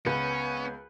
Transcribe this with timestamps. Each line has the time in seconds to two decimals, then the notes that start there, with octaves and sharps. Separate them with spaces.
0.06 C#2 B3 C#4 B4